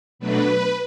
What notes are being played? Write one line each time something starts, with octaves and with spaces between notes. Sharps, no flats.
B2 F#3 A3 D4 B4